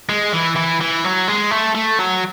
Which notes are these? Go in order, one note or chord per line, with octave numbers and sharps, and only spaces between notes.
G#3
E3
E3
E3
F#3
G#3
A3
A3
F#3